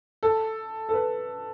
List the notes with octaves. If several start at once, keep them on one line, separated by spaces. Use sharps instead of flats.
A4
A4
B4